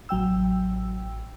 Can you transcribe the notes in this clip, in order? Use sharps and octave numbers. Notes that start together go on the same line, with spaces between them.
A1 F#3 G5 E6